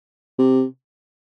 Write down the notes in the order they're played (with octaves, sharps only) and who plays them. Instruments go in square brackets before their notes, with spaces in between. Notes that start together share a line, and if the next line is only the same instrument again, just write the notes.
[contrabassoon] C3